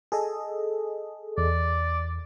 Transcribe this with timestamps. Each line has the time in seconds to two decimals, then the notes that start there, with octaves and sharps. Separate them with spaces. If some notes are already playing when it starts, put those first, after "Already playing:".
0.12 G#4 A4 D#5
1.38 E2 D5